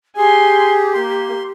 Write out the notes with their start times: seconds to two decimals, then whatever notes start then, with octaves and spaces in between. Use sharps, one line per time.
0.17 G4 G#4 G#5 C6
0.94 A#3 C6